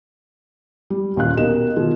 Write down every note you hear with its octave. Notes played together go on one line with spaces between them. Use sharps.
G3
D#1 A#2 C#4 F5 F#6
B2 D#4 G4 A#4 D#5 E7
B2 D#3 F4 G#4